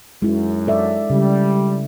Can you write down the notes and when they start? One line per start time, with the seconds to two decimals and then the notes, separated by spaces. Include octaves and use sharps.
0.22 F#2 G#3 E4
0.67 A4 D5 E5
1.10 C#3 G3